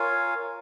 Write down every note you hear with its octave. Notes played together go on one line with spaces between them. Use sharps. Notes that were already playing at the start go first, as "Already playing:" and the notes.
Already playing: F4 A#4 C#5 F5 G#5